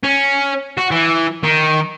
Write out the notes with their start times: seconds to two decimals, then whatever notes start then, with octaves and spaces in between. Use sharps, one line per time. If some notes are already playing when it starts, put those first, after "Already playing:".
0.04 C#4
0.78 F#4
0.91 E3
1.44 D#3